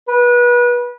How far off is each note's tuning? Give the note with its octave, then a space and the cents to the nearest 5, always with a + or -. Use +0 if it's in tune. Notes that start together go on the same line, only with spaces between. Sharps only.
B4 -30